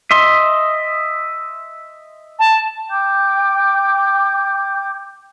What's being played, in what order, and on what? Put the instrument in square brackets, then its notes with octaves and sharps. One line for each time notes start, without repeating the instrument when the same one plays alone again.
[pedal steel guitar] D#5 E5 C6
[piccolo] A5
[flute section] G5 D6 G6